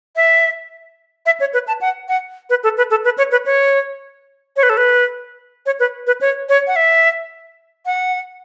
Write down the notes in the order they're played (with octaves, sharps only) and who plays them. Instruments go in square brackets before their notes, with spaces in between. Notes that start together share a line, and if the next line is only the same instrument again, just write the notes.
[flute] E5
E5
C#5
B4
A5
F#5
F#5
B4
A4
B4
A4
B4
C#5
B4
C#5
C#5
B4
A4
B4
C#5
B4
B4
C#5
C#5
F#5
E5
F#5